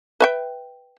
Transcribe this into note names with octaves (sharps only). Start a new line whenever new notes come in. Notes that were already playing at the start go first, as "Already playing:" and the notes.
B4 E5 G5